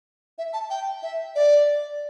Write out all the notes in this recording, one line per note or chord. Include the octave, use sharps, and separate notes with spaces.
E5
A5
G5
E5
D5